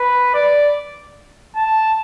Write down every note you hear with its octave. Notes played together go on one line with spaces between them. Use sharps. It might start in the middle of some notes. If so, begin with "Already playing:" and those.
Already playing: B4
D5
A5